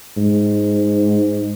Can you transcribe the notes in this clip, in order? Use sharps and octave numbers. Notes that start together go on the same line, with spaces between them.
G#2